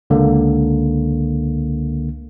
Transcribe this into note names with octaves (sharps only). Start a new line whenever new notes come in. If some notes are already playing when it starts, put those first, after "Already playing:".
C#2 D3 A#3